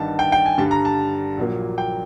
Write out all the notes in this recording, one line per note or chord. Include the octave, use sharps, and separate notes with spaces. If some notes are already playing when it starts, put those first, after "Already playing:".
Already playing: G1 G2 D#3 A5
G5
G5
G#5
G2 D3 G3 A5
A#5
A5
A#1 A#2 F#3 A#3
G5